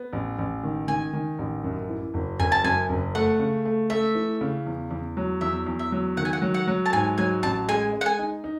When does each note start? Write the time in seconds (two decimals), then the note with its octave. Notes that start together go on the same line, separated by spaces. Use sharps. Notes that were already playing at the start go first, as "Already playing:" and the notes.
Already playing: B3
0.13 A1
0.38 A1
0.63 D#3
0.88 D#3 G#5
1.13 D#3
1.39 A1
1.64 F#2
1.89 E3
2.14 F#1
2.40 F#1 G#5
2.52 A5
2.64 F#2 G#5
2.89 F#1
3.15 A3 F#5
3.39 C#3
3.65 A3
3.90 A3 E5
4.15 E3
4.41 C#3
4.66 E2
4.91 E2
5.17 F#3
5.41 E2 E5
5.66 E2
5.79 E5
5.92 F#3
6.17 D#3 F#5
6.25 G#5
6.33 F#5
6.42 F#3
6.54 F#5
6.67 F#3
6.86 A5
6.93 G#2 G#5
7.18 F#3 G#5
7.43 A1 A5
7.68 G#3 G#5
7.93 G#3
8.01 F#5
8.06 G#5
8.19 D#4
8.44 D#4